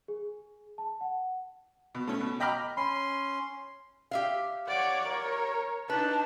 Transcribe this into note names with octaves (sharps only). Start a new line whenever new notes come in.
G#4
A5
F#5
B2
A3 C#4
B2
D#5 G5 A#5 B5 D6 F6
C#4 B5 C6
G4 E5 F5
C#5 D5 F#5
A#4 C#5
D4 D#4 B4 A5